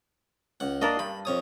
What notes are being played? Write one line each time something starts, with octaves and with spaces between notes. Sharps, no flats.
C#2 F#5
A#3 D4 A#4 D#5
G2 B5
F2 C#5 D#6